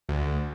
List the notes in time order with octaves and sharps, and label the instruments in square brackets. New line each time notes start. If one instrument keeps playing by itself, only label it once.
[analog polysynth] D2